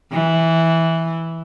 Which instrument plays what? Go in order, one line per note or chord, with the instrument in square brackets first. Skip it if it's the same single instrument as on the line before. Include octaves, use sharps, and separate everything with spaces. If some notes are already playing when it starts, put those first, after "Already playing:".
[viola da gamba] E3